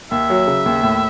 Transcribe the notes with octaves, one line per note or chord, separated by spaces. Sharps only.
D#2 E5
F#3
C#3
D#2
A2